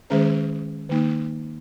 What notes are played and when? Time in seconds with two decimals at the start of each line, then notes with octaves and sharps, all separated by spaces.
0.10 D#3 G#3 C#4 G#4 C5
0.89 D#3 A#3 D#4